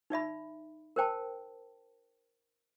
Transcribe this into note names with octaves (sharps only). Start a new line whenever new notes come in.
D#4 D5 E5 B5
A#4 C5 G5 A5